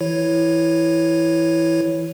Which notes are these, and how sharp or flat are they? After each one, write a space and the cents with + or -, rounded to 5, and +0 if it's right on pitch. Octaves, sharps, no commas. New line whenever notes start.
E3 +0 E4 +0 C#5 +0